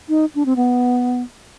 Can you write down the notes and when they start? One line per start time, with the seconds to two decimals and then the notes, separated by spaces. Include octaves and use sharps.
0.09 D#4
0.35 D4
0.46 C4
0.56 B3